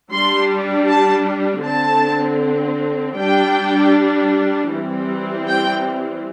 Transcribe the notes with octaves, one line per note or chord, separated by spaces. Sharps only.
G3 D4 C6
A5
D3 C4 A5
G3 D4 G5
E3 G3 C4
G5